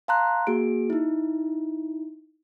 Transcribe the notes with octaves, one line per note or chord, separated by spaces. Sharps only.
F5 A5 A#5 C6 F#6
A#3 F#4 G#4 D7
D#4 E4